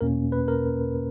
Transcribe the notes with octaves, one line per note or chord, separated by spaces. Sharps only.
E2 B2 A#3 C#4 A#4
B4
A#4